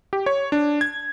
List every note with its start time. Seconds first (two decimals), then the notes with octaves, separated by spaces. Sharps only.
0.13 G4
0.26 C#5
0.52 D4
0.81 G#6